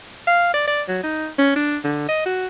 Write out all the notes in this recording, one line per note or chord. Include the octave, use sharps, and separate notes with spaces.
F5
D5
D5
F#3
D#4
C#4
D4
D3
D#5
F#4